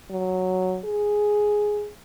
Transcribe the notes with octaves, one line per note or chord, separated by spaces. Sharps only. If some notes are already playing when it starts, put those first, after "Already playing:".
F#3
G#4